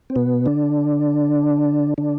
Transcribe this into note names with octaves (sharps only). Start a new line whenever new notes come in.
C4
B2 B3
D3 D4
D3 D4